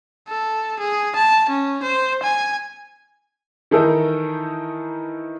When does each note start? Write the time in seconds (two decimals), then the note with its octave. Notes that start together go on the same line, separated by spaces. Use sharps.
0.29 A4
0.80 G#4
1.16 A5
1.49 C#4
1.83 C5
2.23 G#5
3.71 D#3 E3 D#4 E4 A4 A#4